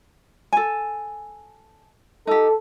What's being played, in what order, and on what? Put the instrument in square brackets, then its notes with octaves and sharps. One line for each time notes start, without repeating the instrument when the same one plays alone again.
[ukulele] A4 G#5
[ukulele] D#4 G4 [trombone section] A4